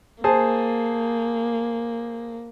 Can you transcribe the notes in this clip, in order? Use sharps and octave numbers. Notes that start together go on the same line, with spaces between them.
A#3 G#4 C5 A5